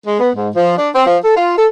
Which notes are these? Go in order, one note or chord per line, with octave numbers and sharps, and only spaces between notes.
G#3
B3
G#2
F3
D4
C4
F3
A4
F4
A4